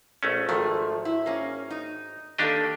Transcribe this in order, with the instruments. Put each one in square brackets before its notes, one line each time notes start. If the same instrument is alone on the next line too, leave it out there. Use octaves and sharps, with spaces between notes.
[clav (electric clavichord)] A#1 A3 C#4
[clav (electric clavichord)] G#1 D#3 [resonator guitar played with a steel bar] G#2 F3 A3
[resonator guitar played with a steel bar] E4
A#3 C#4
D#4
[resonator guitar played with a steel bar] D#3 A#3 A4 [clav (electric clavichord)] D4 G4 D#5